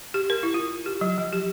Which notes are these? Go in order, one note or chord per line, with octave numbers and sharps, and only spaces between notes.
G4
A#4
E4
F4
G4
F#3
F3
G4